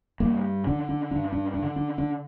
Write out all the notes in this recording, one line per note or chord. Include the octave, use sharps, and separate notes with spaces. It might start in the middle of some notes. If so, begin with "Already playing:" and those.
G2 A#3
D3 D4
D4
G2 D4
D4
D4
D3
D4
D4